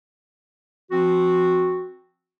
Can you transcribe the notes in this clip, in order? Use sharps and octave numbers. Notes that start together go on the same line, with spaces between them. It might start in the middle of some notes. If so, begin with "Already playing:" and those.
F3 C4 F#4